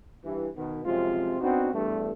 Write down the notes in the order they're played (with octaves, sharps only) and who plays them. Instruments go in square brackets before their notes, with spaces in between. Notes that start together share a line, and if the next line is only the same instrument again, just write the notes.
[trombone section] G2 E3
B2 D#3 B3
F#2 C3 F3 G#3 C4 F4
B3 C4 D4 D#4 F#4
E2 G2 A3